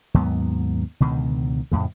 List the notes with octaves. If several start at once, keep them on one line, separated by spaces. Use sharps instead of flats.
D#2 G#2 F#3 B3
C#2 B2 D3 D#3
F2 A2 C#3